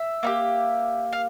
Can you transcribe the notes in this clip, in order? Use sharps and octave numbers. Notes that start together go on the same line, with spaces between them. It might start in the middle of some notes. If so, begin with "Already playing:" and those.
Already playing: E5
A#3 D#4 G4
F5